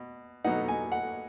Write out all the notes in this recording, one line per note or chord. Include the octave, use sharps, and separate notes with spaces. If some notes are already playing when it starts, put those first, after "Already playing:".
Already playing: B2
B2 F#3 B3 D#4 F#5
G#5
F#5